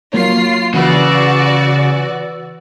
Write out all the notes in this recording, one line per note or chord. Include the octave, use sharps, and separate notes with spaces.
F#3 A#3 F4 C#5 C7
C#3 E3 F#4 B4 D5 E6